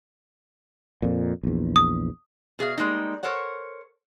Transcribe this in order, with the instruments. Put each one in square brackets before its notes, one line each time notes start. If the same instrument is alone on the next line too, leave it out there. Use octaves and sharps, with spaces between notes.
[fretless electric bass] F2 A#2
A#1 E2
[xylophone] D#6
[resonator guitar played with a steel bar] B2 G#4 E5 F5
G3 G#3 A#3 D#4
A4 A#4 C5 C#5 F#5